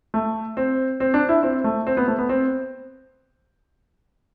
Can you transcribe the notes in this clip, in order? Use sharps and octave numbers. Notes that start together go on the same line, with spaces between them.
A3
C4
C4
D4
E4
C4
A3
C4
B3
A3
B3
C4